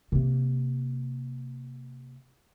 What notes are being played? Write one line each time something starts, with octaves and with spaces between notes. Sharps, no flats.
C3 A#3